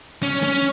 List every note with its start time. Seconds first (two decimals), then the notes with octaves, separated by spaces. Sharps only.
0.23 C#4
0.44 C#4